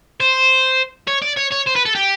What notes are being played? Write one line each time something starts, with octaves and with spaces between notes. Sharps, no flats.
C5
C#5
D5
C#5
C#5
C5
B4
A4
G4